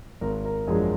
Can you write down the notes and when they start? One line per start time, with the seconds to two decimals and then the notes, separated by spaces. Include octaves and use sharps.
0.21 G#1 A#4
0.45 A#4
0.67 F#2 F3 G#3 D4 G#4